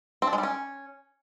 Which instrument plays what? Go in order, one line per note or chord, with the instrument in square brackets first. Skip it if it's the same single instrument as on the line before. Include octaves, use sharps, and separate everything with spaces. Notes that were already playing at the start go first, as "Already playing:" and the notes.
[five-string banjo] C4
D4
G#3
G3
C#4